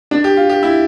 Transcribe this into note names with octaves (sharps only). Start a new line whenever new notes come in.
D4
G4
F4
G4
E4